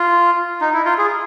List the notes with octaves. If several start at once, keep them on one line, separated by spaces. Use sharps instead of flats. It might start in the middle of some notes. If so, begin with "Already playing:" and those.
Already playing: F4
D#4
E4
F4
G#4